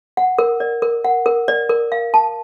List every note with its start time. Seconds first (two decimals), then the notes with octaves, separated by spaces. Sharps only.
0.17 F#5
0.38 A#4
0.60 D5
0.82 A#4
1.04 F#5
1.26 A#4
1.48 D5
1.69 A#4
1.92 F5
2.14 A5